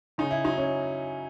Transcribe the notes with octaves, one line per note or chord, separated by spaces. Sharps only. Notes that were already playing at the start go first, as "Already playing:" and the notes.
C#3 D#4
E4
F#3 D#4
C#4